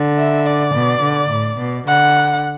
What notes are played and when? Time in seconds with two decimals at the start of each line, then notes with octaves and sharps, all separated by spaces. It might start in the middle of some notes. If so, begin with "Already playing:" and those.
Already playing: D3
0.19 E5
0.46 D5
0.75 B2
1.03 D3
1.31 A2
1.59 B2
1.87 D3 F#5